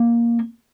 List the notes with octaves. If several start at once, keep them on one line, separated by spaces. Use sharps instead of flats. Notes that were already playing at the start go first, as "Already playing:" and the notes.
Already playing: A#3